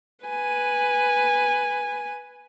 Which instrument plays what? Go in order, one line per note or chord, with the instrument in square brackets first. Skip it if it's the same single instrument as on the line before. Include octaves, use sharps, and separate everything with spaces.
[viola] B4 G#5